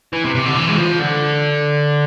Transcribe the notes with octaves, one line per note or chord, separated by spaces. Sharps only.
E3
C3
C3
D3
E3
G#3
F3
D3